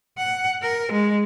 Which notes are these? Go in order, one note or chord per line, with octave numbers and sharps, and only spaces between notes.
F#5
A#4
G#3